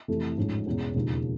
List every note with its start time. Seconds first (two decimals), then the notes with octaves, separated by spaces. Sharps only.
0.08 F2 C3 E3 A3
0.37 A1 G#2 F3 G#3 C#4
0.66 E2 B2 G#3 C#4
0.95 E1 D#2 C#3 F3